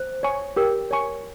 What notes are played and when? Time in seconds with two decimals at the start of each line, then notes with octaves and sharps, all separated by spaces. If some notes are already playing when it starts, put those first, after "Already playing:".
Already playing: C5
0.23 C#5 G#5 C#6
0.57 G4 A#4
0.91 C#5 G#5 C#6